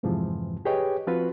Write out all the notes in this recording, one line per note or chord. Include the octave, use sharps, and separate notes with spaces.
F2 G#2 C3 E3 F3
G4 G#4 B4 C#5 D#5 G5
F3 C4 F4 F#4 B4